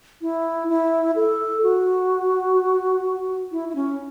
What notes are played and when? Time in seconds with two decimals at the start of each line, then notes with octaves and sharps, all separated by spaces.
0.22 E4
0.69 E4
1.16 A4
1.63 F#4
3.52 E4
3.69 E4
3.75 C#4